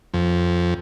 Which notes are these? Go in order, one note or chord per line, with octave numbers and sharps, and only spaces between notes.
F2